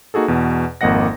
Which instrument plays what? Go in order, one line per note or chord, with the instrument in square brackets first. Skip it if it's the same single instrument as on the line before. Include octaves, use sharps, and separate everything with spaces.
[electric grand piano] A#3 D#4 F#4 G#4 A4
E2 B2
G#1 F2 A#3 D#5 F#5 A#6